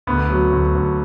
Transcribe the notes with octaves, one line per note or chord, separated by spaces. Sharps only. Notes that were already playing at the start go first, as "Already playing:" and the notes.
D2 B3
F#3
D2
D2